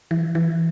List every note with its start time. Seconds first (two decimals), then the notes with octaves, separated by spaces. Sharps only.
0.11 E3
0.35 E3